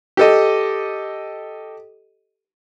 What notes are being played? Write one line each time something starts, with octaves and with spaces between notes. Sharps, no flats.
G4 A4 D#5